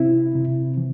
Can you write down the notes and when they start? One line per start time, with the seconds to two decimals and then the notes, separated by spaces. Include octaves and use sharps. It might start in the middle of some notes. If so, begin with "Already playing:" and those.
Already playing: C3 C4 E4
0.35 C3
0.77 E3